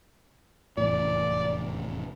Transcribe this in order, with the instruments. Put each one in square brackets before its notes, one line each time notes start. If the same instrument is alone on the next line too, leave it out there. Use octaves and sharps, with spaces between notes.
[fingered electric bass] F1 E2 A2 [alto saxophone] D5